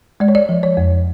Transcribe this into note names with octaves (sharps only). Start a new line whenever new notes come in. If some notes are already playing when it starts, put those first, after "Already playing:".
G#3 D5
C#5
D5
F3
C#5
F2